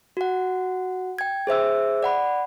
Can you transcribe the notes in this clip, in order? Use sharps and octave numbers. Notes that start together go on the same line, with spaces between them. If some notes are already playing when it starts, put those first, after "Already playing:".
F#4 F#5
G5 G#6
G#4 C5 E5 E6
D5 F#5 B5